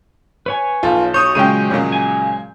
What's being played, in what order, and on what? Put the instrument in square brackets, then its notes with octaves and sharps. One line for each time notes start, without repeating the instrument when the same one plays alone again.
[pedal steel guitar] B4 C#5 G#5
[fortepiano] B1 A5 [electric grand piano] F4
[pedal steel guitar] F#3 C#5 [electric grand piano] C#6 D#6 G6
[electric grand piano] A#2 G#3 D#7 [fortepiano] C#3 C#4 G5
[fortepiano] A#2 C#3 F#3 [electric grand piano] G#3
[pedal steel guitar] G#5